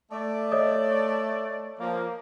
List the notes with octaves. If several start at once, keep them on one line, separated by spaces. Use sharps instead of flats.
A3 D5
C#5 D#5 D#6
F3 A#3